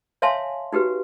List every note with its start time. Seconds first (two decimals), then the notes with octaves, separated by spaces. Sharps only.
0.22 C#5 E5 F5 G#5 A5 C6
0.73 D#4 F#4 G4 B4